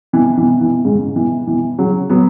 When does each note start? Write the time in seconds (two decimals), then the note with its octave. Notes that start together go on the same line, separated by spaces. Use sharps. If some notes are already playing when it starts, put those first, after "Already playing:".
0.13 B2 E3
0.37 B2 E3
0.61 B2 E3
0.84 G#2 C#3
1.16 B2 E3
1.47 B2 E3
1.79 C#3 F#3
2.10 F#3 B3